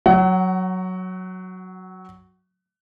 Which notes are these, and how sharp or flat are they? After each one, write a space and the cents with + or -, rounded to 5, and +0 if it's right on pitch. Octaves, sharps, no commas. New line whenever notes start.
F#3 +0 F#5 +30